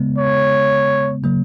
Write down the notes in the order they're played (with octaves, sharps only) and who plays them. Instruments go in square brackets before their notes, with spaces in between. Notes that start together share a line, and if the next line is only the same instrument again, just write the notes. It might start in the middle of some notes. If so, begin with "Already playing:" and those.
Already playing: [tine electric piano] C#3 G#3 B3
[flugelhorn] C#5
[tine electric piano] C#3 F#3 A#3